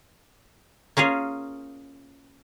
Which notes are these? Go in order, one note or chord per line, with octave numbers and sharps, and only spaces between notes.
A#3 C#4 F4 G#4